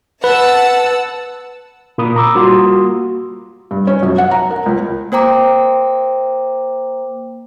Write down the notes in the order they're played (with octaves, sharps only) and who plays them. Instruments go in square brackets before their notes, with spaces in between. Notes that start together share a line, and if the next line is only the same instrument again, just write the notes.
[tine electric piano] B4 [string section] F#5 A5 E6
[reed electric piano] A#2 A#3 B5 D#6
A#5 D6 E6
G3 A#3 F4 F#4 C6 D#6
[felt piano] G2
C#4
F#2
F#5
A#5
A#4
C#2
[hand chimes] A#3 C5 G5 A#5 D6